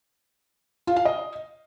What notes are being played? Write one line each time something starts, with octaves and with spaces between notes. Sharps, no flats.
F4
F5
D#5